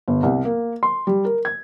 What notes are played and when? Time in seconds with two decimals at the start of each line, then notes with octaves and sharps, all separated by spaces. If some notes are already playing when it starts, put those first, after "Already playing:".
0.08 G1
0.23 C2
0.45 A#3
0.83 C6
1.07 G3
1.25 A#4
1.45 G#6